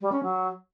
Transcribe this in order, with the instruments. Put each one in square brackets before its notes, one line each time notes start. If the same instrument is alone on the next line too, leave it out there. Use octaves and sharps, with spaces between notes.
[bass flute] G3
C#4
F#3